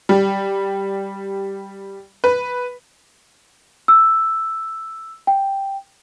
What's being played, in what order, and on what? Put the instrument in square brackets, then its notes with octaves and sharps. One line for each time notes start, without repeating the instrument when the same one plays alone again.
[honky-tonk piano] G3
B4
[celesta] E6
G5